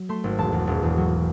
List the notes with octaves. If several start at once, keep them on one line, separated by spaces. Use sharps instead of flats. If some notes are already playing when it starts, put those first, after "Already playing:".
Already playing: F#3
A3 C6
G#1
E1 A5
E2
E1
E2
F#3